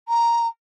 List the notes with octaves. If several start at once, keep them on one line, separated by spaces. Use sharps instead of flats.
A#5